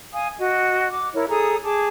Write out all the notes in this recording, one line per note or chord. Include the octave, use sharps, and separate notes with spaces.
F5 G#5 D#6
F#4 D#5
D6
E4 A#4 C#5
G#4 A4 A#5 D#6
G#4 A5 D6